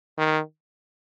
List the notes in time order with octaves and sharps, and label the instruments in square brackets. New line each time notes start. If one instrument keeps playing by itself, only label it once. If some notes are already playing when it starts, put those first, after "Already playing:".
[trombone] D#3